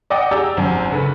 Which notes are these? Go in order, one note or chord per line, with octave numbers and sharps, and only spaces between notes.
D5 D#5 F#5 G5 D6 D#6
G4 G#4 D5 A#5 D6 E6
G#1 F#2
F#1 D3 B4